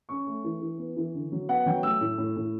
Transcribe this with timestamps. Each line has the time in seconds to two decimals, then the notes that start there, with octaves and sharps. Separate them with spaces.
0.09 C#4 C#6
0.27 A3
0.44 E3
0.61 E3
0.78 B3
0.97 E3
1.14 D3
1.32 F#3
1.49 B3 F#5
1.66 F#3 G5
1.83 A3 E6
2.01 A2
2.18 A2
2.36 A2